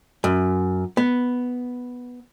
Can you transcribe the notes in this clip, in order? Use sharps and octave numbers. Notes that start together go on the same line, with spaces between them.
F#2
B3